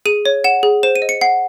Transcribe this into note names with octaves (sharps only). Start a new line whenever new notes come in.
G#4 D#7
C#5
F#5 E7
G#4
C5 E7
D#7
D#5
C#7
F#5 C7